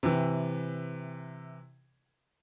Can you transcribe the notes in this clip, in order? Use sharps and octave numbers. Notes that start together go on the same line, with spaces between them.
C3 E3